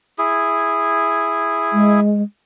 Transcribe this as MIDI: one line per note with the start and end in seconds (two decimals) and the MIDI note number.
0.18 2.00 64
0.18 2.00 68
1.73 2.22 56